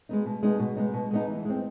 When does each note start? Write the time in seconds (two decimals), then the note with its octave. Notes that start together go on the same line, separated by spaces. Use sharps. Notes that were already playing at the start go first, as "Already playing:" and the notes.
0.09 G#3 B3 D#4
0.26 B2
0.43 G#3 B3 D#4
0.59 B2
0.76 G#3 B3 D#4
0.94 B2
1.11 G#3 B3 D#4
1.28 E3
1.45 G#3 C4